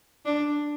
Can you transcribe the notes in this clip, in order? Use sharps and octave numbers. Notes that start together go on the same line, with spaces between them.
D4